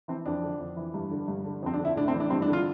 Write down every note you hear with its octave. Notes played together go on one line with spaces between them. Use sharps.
E3 C4
F2 D4
D3
F2
E3
G2
D3
G2
D3
F2 C4
D4
D3
E4
A2 D4
C4
E3
D4
G2 C4
D4
D3
F4